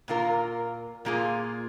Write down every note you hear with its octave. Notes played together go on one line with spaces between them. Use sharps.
A#2 A#3 F4 A#4
A#2 A#3 F4 G#4